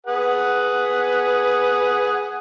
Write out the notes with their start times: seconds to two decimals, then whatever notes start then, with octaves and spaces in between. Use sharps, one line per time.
0.07 G#4 B4 F#5